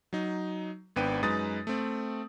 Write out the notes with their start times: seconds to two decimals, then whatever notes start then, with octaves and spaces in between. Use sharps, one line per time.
0.13 F#3 D#4
0.96 G#1 B3 D4 B4 G5 D#7
1.23 F#2 G#3 D#4 B4 D#6 A6
1.67 A3 C4